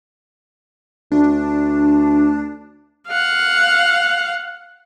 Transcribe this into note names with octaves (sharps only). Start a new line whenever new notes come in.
D2 D4
F5 F#5